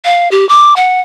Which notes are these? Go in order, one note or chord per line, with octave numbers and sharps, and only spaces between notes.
F5
G4
D6
F#5